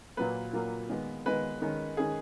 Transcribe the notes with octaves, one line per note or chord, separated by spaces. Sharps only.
A#2 F#3 A#3 B4
A#2 F#3 A#3
D#3 G#3 B3
D#3 G#3 B3 B4
D#3 G#3 C#4
D#3 G#3 C#4 G#4